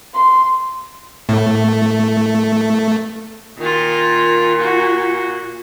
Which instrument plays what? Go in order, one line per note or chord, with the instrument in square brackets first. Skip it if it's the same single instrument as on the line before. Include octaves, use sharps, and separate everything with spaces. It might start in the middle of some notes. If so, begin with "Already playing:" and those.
[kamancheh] C6
[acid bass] A2 [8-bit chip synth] A3
[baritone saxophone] A#2 [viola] D#3 F4
[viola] F#4